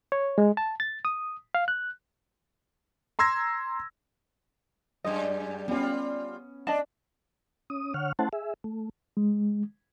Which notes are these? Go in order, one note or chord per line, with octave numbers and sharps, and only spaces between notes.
C#5
G#3
A5
A6
D#6
F5
F#6
A#5 C6 E6 G#6 A#6
F#2 G3 G#3 D#5
G3 B3 C#4 F4
D4 D5 D#5 A5
C#4 D#6
D3 C#5 F#5 F6
A3 C#4 E4 C5 F#5 A5
G#4 E5
A3
G#3